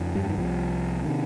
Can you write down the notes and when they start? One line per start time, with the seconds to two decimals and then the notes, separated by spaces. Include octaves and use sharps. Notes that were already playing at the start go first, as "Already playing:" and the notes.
Already playing: F2 C#3
0.15 G2 G3
0.30 D#3
0.37 C2 C3 F3
1.04 C3 D#3